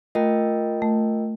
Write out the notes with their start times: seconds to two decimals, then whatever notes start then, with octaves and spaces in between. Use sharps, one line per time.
0.15 A3 F4 A#4 D#5 G5
0.82 A3